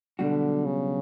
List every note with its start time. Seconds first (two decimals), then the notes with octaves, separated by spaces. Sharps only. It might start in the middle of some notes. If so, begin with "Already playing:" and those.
0.19 B1 B2 D3 G3 D4 F#4
0.65 C#3